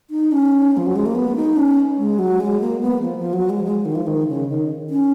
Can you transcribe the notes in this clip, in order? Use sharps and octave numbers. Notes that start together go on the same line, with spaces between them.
D#4
C#4
F3
F#3
G#3
A#3
B3
D#4
C#4
G#3
F#3
G#3
A#3
B3
F3
F3
F#3
G#3
G#3
D#3
F3
D#3
C#3
D#3
C#4